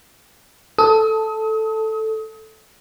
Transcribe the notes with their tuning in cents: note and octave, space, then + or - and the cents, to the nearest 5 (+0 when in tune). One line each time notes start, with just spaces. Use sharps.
A4 +0 D#6 +35